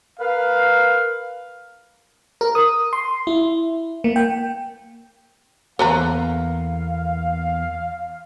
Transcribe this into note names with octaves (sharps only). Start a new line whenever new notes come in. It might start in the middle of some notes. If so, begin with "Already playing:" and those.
A#4 B4 F5
A#4
D#6
C6
E4
A#3
G5
E2 A#3 B3 A4 B4 F5 A#5